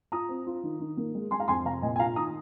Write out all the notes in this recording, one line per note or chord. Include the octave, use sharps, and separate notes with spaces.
F4 A#5 D#6
C4
F4
D#3
D#3
A#3
G#3
G#3 G#5 C6
F5 A#5
F2 G#5 C6
C3 F5 A#5
A#2 D#5 G#5
G#5
F4 F5 A#5
D#3 A#5 D#6